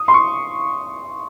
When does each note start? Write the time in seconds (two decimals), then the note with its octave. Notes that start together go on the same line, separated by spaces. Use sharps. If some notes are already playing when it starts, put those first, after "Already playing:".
Already playing: D#6
0.08 C6
0.14 C#6